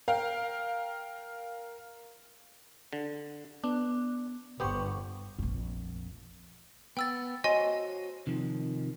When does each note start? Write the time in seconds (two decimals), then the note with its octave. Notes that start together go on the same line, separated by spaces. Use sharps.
0.08 A#4 F5 G5
2.93 D3
3.64 B3 D4
4.60 G1 B3 G4 B4 C5 C#6
5.39 A#1 F2
6.97 B3 G5 E6 A6
7.44 F#4 C5 C#5 D#5 G#5 C6
8.27 C3 D#3 F3